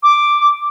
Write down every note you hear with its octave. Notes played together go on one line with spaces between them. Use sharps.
D6